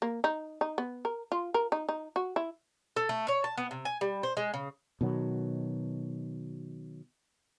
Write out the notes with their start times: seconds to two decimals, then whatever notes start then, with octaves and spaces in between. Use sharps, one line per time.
0.02 A#3
0.24 D#4
0.61 D#4
0.78 B3
1.05 A#4
1.32 F4
1.54 A#4
1.72 D#4
1.89 D#4
2.16 F#4
2.36 E4
2.96 A4
3.09 A3
3.28 C#5
3.44 A5
3.58 B3
3.71 C3
3.85 G#5
4.01 G3
4.23 C5
4.37 G#3
4.54 C#3
5.01 B2 D#3 F#3